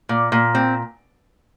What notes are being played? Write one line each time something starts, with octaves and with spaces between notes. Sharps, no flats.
A#2
A#2
C4